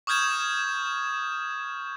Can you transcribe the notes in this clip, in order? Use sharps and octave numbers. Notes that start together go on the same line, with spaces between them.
C#6 D#6 F6 G6 G#6 E7